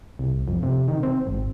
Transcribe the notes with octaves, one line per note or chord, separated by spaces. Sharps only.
C2
F2
C3
D#3
C4
G#1